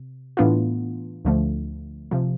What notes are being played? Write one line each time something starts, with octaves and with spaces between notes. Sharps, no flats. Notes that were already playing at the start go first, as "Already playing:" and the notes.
Already playing: C3
A2 E3 B3 D4 F4
D2 D3 F3 A3
C3 F3